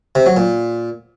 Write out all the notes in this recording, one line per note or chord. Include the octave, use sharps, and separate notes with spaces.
C3
F#3
A#2